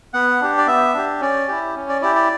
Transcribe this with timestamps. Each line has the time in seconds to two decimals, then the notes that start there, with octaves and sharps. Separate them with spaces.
0.14 B3 F#5
0.41 D4 G4
0.58 D5
0.67 B3 E5
0.94 D4 G4
1.21 C#4 D5
1.48 E4 G4
1.76 C#4
1.89 D5
2.01 E4 G4 D5
2.16 D5